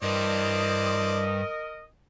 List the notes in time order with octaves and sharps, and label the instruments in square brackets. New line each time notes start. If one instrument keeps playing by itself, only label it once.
[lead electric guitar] G2 [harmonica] E3 C5 D5 [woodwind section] A#4 D#5 D#6